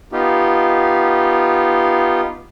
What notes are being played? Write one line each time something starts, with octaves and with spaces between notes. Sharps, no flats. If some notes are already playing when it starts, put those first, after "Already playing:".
B3 D#4 F4 G4